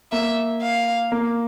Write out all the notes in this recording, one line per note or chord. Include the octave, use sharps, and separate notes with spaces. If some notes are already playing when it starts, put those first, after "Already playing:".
A#3 E5
F5
A#3